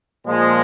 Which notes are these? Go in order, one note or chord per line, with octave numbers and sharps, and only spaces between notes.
A#2 F3 G#3